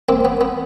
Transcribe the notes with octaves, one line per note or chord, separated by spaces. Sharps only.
A#3 C4
B3
B3